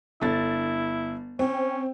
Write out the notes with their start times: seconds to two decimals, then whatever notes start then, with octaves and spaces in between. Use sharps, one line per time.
0.22 G1 E4 A6
1.39 C4 C#4